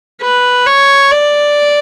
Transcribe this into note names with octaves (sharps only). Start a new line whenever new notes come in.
B4
C#5
D5